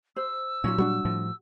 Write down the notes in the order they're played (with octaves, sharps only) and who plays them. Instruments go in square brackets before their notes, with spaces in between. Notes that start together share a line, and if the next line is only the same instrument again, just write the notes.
[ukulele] C5 [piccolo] E6
[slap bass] A#2 F#3 [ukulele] C#4 D#4 F4
[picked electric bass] G3 A3 D4 [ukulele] F#4
[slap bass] A2 F3